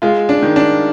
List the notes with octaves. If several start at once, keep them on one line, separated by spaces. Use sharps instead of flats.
G#3 F4
D4
D#3
D4